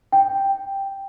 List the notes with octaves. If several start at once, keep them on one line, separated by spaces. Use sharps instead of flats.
G5